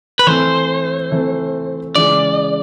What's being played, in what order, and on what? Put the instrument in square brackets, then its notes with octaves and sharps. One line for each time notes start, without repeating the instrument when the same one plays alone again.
[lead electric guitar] B4
[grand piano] E3 A3 C4 [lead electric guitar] C5
[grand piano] E3 A3 C4
[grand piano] C#3 E3 G#3 [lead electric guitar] D5